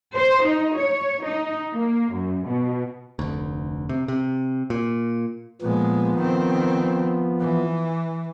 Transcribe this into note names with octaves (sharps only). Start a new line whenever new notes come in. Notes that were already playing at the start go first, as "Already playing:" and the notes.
C5
D#4
C#5
D#4
A#3
F#2
B2
F1 D2
C3
C3
A#2
A#2 F3 G#3 B3
D#3 C4
E3